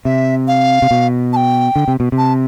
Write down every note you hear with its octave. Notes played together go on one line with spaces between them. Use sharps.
C3 E5
F5
C3
B2
A5
G5
D3
C3
B2
C3
A5